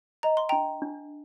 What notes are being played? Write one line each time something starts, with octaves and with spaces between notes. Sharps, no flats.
D#5 A#5
C6
D4 G5 A#5
D4